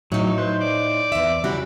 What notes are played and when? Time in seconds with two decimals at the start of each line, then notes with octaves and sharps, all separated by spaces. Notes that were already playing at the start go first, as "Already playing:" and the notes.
0.12 A2 F#3 D#4 C#5
0.38 B4 C5
0.61 D5
1.12 E2 E5
1.44 C#3 G3 E4 F#4